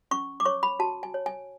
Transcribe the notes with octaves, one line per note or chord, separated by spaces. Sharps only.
C#4 C#6
D6
C#5 C#6
B5
F#4 A5
G#5
C#5
G#5